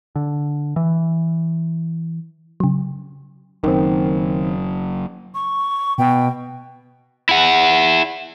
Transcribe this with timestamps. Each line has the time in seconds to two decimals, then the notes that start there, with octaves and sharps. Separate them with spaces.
0.16 D3
0.76 E3
2.60 C#3 F#3
3.64 F#1 F#2 D#3 C4
5.34 C#6
5.98 B2 G5
7.29 E4 F#5